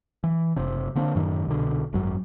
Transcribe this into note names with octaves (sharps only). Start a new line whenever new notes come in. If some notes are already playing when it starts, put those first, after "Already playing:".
E3
F#1 C3
D3 A#3 C4 D4
F#2 A2 D#3 F#3
C2 B2 D3
G#1 F#2 F#3